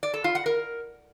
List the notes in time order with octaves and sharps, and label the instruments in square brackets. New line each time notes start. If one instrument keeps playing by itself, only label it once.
[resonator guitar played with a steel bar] D5
A4
F4
F#5
A#4